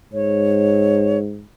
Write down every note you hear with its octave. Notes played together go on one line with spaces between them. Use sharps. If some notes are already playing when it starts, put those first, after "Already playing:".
G#2 C#5